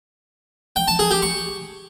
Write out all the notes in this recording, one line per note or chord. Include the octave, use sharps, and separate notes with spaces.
G5
A5
G#4
G4
C#6